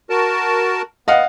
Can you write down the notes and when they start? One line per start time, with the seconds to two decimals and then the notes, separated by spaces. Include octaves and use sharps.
0.10 F#4 A#4 A5
1.08 B3 D#5 F5 F#5